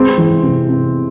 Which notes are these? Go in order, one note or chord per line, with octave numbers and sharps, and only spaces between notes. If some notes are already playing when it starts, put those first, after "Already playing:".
Already playing: G#3 C4
E3
C3
C3